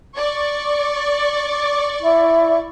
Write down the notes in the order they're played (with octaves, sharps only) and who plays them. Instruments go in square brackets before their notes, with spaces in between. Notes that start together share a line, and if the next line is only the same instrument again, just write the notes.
[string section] D5 C#6
[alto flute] E4